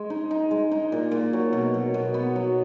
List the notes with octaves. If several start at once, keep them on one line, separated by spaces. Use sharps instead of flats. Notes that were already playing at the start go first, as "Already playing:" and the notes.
Already playing: G#3
D#4
D#4
G#3
D#4
A#2
A#2
F#3
B2
F#3
B2
B3
F#3